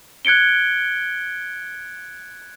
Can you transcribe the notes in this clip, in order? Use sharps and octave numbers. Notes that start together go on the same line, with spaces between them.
F#6 G#6 C#7 D7 G7